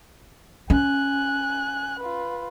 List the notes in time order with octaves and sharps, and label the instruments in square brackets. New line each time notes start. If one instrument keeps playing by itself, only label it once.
[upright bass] C#4 [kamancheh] G#5 F#6
[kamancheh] F4 B4